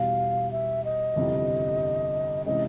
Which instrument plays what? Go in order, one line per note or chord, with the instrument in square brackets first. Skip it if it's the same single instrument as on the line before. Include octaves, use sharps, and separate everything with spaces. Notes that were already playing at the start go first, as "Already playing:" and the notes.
Already playing: [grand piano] E2 B2 G3 [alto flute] F5
[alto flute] E5
D#5
[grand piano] G1 F2 C3 E3 G3
[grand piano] C3 E3 G#3 C#4 [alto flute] D#5